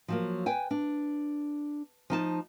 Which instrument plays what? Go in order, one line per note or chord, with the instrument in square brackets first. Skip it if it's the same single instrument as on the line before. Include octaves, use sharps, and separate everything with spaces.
[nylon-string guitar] F3 F#3 A#3
B4 G5 G#5
D4
F3 D#4 A5